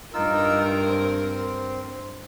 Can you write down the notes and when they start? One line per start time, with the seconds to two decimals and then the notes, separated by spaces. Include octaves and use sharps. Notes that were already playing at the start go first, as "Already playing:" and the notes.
0.14 G2 D#4 F4 A#4 E6
0.88 C4